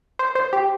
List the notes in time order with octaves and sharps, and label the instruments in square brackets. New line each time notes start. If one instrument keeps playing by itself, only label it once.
[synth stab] C5
C5
G4